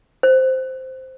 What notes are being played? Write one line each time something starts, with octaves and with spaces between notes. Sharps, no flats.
C5